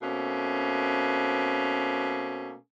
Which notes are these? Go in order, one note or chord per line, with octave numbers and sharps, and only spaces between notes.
B2 A3 A#3 C4 C#4